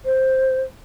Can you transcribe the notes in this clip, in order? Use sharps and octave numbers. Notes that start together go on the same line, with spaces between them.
C5